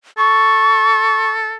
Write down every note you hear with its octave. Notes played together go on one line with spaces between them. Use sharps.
A4 C#6